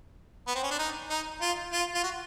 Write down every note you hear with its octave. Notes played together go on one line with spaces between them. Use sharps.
B3
C4
C#4
D4
D#4
D#4
F4
F4
F4
F#4